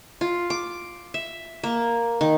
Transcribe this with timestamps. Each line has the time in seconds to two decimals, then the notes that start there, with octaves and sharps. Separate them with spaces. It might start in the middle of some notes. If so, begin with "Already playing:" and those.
0.21 F4
0.50 D6
1.14 E5
1.63 A#3
2.21 D#3